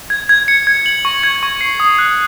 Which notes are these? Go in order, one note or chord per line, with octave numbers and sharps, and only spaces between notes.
G#6
G#6
C#7
G#6
F#7
C#6
G#6
C#6
C7
D#6
F#6